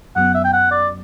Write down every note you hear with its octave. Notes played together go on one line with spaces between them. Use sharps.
F#2 F#3 B3 F#5
E5
G5
F#5
D5